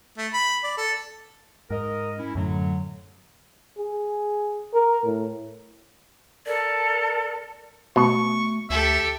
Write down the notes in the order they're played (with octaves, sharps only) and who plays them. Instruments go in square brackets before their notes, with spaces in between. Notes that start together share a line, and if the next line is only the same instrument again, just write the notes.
[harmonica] A3
B5
D5
A4
[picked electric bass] G#2 [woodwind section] A#4 D#5
[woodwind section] C#4 E4
[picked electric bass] F#2 A2 [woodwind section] D3 F#3
[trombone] G#4
A#4
A2
[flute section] A4 A#4 A5 [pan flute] D5
[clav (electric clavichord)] B2 [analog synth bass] A3 [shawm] C#6
[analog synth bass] D2 [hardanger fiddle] G4 A4 [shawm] E5